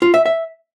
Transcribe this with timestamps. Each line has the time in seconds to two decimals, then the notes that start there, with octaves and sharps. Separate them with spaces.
0.02 F4
0.14 E5
0.26 E5